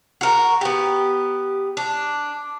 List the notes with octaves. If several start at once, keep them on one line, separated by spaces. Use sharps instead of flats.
F#4 A#4
B3 G4
D4